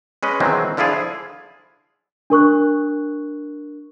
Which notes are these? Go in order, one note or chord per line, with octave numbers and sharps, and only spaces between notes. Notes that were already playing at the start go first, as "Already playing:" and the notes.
G#3 C#4 B4 D#5
B2 D#3 E3 F#3 G#3 C4
D3 F3 E4 F4 G#4
D4 A#4 C#6 F#6